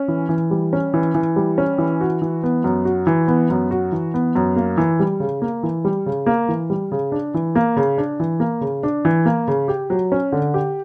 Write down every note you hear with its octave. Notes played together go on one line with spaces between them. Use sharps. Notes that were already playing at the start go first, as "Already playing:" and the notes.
Already playing: C#4
E3
E3
G3
C#4
E3
E3
G3
C#4
E3
F#4
E3
B3
F#2
F#4
E3
B3
F#2
F#4
E3
B3
F#2
A#3
E3
G3
C#3
A#3
E3
G3
C#3
A#3
E3
G3
C#3
D4
E3
A#3
C#3
D4
E3
A#3
C#3
D4
E3
A#3
C#3
G4
F#3
C#4
D3
G4